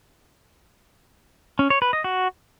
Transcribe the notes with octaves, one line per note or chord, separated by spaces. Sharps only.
C#4
C#5
B4
D#5
F#4